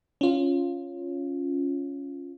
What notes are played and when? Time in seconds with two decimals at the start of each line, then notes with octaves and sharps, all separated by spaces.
0.21 C#4 F4